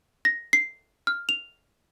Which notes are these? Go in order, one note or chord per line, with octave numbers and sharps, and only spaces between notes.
A#6
C7
F6
F7